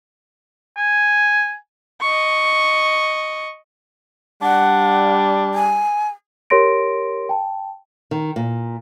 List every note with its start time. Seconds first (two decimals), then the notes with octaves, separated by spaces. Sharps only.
0.77 G#5
2.01 D#5 C#6
4.42 G3 D4 F#5
5.54 G#5
6.50 G4 A#4 C#5 C6 A#6 D7
7.29 G5 A5
8.11 D#3
8.36 A#2